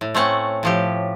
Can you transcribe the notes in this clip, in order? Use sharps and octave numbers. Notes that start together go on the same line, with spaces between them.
A2
A3 C4 C#4 F#5
A2 F3 G4